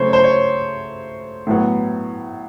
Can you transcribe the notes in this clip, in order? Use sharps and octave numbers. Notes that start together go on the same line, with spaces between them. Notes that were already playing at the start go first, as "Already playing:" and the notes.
Already playing: C#3 F#3 A3 C5 C#5
C5
C#5
A2 F#3 B3